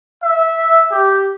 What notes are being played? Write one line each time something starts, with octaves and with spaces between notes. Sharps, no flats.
E5
G4